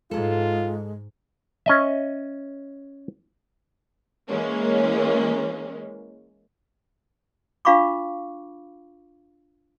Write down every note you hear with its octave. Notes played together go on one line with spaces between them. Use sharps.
G#2 G#3 F4 G#4 A4
C#4 D#5 E5
E3 G#3 A#3 C#4
D4 F4 F5 B5 C#6 D6